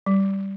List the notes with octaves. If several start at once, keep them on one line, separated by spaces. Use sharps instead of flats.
G3